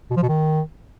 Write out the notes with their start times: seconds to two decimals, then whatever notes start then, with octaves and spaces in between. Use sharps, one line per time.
0.11 B2
0.17 F3
0.23 B2
0.29 D#3